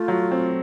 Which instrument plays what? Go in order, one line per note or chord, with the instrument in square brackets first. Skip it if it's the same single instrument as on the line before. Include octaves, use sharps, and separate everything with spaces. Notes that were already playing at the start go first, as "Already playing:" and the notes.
Already playing: [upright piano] A3 [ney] F4
[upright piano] F#3
C4